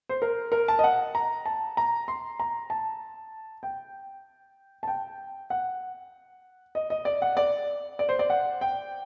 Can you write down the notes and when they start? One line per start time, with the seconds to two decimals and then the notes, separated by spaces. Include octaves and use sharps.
0.09 C5
0.22 A#4
0.52 A#4
0.68 A5
0.79 D#5
0.84 F#5
1.15 A#5
1.46 A5
1.77 A#5
2.08 C6
2.40 A#5
2.70 A5
3.63 G5
4.83 A5
4.88 G5
5.50 F#5
6.75 D#5
6.90 D#5
7.05 D5
7.22 F#5
7.37 D5
7.99 D5
8.09 C5
8.19 D5
8.30 F#5
8.61 G5